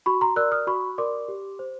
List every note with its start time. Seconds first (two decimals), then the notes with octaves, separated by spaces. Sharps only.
0.06 F#4 B5 C#6
0.21 A#5 C6
0.36 A#4 D5 E6 F#6
0.52 D#6 F6
0.67 F#4 B5 C#6
0.98 A#4 D5 C6 D6
1.28 G4
1.59 C5